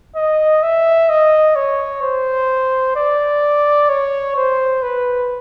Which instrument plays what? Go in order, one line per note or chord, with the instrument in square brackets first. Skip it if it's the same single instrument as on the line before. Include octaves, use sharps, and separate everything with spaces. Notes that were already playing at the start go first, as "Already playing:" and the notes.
[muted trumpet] D#5
E5
D#5
C#5
C5
D5
C#5
C5
B4